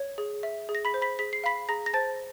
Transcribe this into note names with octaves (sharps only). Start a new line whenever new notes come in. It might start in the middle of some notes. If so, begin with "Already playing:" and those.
Already playing: C#5
G#4
E5
G#4
A#6
B5 B6
C5
B5 B6
G#4 B6
C7
F5 B5 B6
G#4 A#5 A#6
A#6
C5 A5 A6